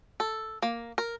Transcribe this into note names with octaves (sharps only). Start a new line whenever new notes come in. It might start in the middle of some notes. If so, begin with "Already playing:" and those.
A4
A#3
A#4